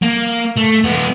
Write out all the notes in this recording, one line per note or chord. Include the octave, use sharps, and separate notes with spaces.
A#3
A3
G#3 B3